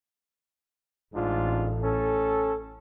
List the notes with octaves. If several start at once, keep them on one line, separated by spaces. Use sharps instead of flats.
A1 G#2 D4 F4
C#4 A4